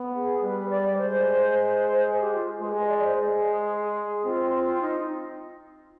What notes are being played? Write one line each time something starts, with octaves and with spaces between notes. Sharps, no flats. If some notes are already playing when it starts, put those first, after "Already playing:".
Already playing: B3
G#4
G3 B4
D5
G#3 C5
G#4
G4
F4
G#3 B4
D#5
D5
C5
G#3 G#4
C4 F4
F4
D#4